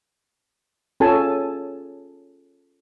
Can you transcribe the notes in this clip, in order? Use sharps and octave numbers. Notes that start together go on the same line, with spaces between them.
C#4 F4 G#4 A4 G#5 A5